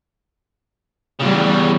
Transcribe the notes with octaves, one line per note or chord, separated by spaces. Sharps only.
E2 C#3 G3